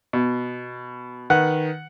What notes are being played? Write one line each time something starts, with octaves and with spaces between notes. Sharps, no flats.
B2
D#3 B4 F#5